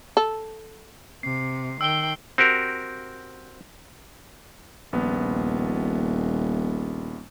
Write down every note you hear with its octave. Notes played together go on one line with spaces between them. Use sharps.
A4
C3 C7
D#3 G5 E6 G7
C4 F#4 G4 A#4
D#1 A#1 B3